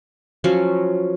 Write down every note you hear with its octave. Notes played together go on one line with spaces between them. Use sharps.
F3 F#3 C#4